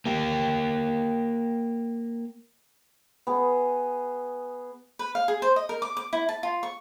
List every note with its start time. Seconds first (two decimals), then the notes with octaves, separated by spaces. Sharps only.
0.06 A#3 G4
3.27 B3 G#4
4.99 B4
5.15 F5
5.28 G#4
5.42 C5
5.56 D#5
5.69 A#4
5.82 D6
5.97 D6
6.13 E4
6.29 A5
6.43 F4
6.63 C#6